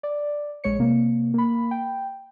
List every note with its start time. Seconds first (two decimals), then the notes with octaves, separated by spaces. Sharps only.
0.03 D5
0.64 A#1 G#3 C#5 C#7
0.79 C3 A#3
1.34 A#3 B5
1.71 G5